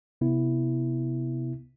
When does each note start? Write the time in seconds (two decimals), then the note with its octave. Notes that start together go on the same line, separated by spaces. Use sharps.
0.21 C3 B3 E4